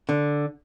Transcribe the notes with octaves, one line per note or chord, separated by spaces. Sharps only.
D3